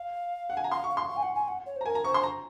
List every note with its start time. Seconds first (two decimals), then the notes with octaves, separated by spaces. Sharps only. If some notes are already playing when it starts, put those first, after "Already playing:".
Already playing: F5
0.50 F#5
0.57 G#5
0.64 A#5
0.72 F5 C6
0.84 C#6
0.90 F5
0.97 C6
1.09 F5
1.16 G#5
1.22 F#5
1.35 G#5
1.48 F#5
1.66 C#5
1.76 C5
1.81 A#5
1.85 A#4 G#5
1.95 A#5
2.04 C5 C#6
2.14 C6
2.23 A#5